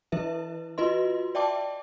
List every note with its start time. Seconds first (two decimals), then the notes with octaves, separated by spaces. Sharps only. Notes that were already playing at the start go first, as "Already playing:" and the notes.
0.12 E3 E4 B4 E5
0.78 F4 F#4 B4 D#5 C6
1.35 D5 E5 G5 A5 D6